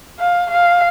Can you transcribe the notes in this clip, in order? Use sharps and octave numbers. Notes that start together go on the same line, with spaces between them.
F5
F5